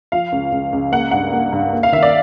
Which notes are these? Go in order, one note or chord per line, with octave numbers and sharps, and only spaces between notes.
F3 F5
C#2
C#2
C#2
A#3 F#5
G2 F#5
A#3
G2
A#3
F5
D#3 E5
D5